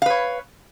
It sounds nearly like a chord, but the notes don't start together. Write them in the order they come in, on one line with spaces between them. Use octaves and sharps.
F5 B4 C#5